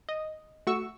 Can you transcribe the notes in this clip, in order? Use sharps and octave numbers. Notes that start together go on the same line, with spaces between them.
D#5
A3 F#4 C#6 E6